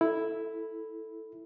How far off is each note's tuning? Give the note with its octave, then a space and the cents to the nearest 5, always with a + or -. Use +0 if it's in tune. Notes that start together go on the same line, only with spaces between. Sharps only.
E4 +0 A4 +0